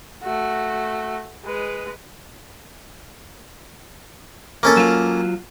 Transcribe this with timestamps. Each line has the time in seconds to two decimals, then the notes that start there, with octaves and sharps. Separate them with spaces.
0.23 A3 F#4
1.45 G#3 B4
4.63 A#3 C#4 A4
4.77 F#3 F4